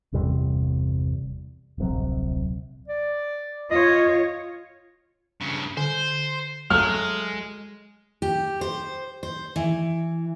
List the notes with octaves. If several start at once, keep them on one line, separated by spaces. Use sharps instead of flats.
G1 E2 C3 G3
D1 A#1 C3 F#3
D5
F4 C#5 D#5
G2 C#3
D3 C5
F#3 G#3 A3 F6
G4
C5
C5
E3